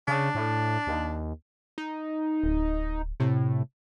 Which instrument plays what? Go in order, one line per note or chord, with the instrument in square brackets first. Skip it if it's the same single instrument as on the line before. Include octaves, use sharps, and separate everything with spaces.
[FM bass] C#3 [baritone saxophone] D4
[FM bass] A2
D#2
[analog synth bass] D#4
[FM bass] D1
[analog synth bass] A2 [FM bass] C3